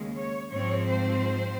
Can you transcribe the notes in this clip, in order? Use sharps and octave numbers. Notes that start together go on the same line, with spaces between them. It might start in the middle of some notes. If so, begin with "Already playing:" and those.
Already playing: D#2 C#3 G#3
C#5
G#2 F3 C4 C#5
C5